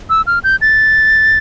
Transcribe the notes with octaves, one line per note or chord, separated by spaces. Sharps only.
E6
F6
G6
A6